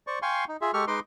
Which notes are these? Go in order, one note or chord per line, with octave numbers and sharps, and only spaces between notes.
C5 D5 C#6
F5 G5 G#5 C6 C#6
D#4
F4 G#4 E5
G#3 G4 A4 C#6 F6
G#3 D#4 B4 D#5 C6 D6